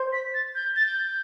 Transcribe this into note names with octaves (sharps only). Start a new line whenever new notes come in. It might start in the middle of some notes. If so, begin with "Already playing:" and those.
Already playing: C5
B6
A6
G6
A6
G6